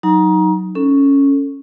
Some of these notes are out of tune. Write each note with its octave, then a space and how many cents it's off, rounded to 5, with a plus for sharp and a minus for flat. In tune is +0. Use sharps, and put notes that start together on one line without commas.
F#3 +0 D#4 +5 A#5 +25
C#4 +0 A4 +20